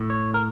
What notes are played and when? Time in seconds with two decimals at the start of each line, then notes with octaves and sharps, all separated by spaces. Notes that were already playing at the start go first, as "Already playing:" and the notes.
Already playing: A2
0.10 C#5
0.34 A#4